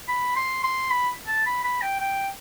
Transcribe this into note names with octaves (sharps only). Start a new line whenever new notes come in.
B5
C6
C6
B5
A5
B5
B5
G5
G5